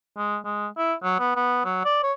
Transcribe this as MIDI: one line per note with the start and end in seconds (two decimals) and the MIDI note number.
0.17 0.38 56
0.45 0.67 56
0.77 0.94 64
1.03 1.18 54
1.19 1.34 59
1.36 1.61 59
1.65 1.83 54
1.85 2.03 74
2.03 2.13 73